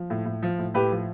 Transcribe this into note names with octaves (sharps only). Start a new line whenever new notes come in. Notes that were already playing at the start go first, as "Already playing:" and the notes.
Already playing: F3
A2
A2
F3
A2
A2 G4 B4
F3